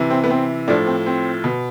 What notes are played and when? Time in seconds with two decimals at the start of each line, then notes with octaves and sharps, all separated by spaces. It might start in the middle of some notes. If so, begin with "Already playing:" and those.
Already playing: C3 E3
0.10 C4
0.24 B3
0.30 C4
0.68 A2 F3 D4
0.87 C4
1.06 C4
1.44 B2